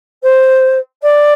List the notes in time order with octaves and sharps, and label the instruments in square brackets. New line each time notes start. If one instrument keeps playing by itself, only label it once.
[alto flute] C5
D5